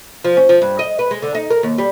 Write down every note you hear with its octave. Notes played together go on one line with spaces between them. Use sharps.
F3
C#4
F3
G2
D#5
B4
G#3
D3
D#4
A#4
D#2
G3